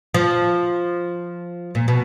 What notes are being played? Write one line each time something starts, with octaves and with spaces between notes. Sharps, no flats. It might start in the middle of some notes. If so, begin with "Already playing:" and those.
F3
A#2
B2